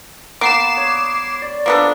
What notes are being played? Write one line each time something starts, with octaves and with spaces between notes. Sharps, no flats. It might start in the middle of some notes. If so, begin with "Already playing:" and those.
A#3 B3 D6 C7 E7
C#5
D5
F3 A#3 B3 D4 A4